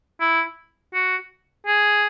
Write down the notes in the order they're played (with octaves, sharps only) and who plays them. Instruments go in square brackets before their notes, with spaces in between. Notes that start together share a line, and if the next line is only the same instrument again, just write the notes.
[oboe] E4
F#4
G#4